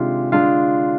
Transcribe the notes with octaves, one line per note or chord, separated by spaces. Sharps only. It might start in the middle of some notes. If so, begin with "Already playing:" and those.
Already playing: C3 D#3 G#3 D4 F4 G4 F5
D3 G#3 D4 F4 F5